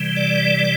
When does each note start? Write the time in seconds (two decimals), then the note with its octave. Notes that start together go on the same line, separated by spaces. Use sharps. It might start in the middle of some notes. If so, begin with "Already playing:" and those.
Already playing: C3 E3 G3
0.17 D5